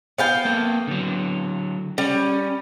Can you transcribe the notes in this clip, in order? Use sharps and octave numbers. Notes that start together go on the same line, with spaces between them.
B3 F5 G5
A#3 A4
D3 F#3
G3 C#4